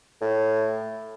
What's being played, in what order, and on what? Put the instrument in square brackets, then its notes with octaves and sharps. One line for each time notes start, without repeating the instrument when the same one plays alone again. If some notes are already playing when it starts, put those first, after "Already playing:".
[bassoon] A2